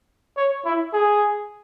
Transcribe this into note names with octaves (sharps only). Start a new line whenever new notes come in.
C#5
E4
G#4